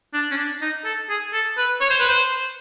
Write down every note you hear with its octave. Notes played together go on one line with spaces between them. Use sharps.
D4
C#4
D4
D#4
A4
G#4
A4
B4
C#5
C5
B4
C5